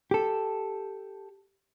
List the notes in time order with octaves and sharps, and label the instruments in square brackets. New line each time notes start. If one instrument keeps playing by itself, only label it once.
[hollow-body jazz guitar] G4 A4